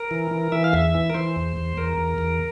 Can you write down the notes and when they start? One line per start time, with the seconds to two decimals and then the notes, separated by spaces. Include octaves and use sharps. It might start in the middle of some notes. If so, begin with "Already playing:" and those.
Already playing: A#4
0.11 E3
0.31 E3
0.52 E3 E5
0.64 F5
0.73 E2 E5
0.95 E3
1.10 A#4
1.14 E3 C5
1.36 E2
1.57 E2
1.77 E2 A#4
1.98 E2
2.18 E2